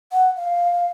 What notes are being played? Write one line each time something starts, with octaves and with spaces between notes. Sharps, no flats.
F#5
F5